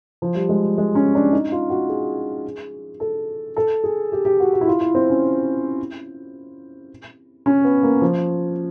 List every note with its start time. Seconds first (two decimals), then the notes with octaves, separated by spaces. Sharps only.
0.22 F3
0.35 G3
0.49 G#3
0.78 G#3
0.95 C#4
1.15 D4
1.33 D#4
1.52 F4
1.70 F#4
1.89 G#4
3.00 A4
3.57 A4
3.84 G#4
4.12 G4
4.25 G4
4.40 F#4
4.54 F#4
4.61 E4
4.67 F4
4.81 E4
4.95 C4
5.10 C#4
7.46 C#4
7.64 B3
7.83 A#3
8.01 F3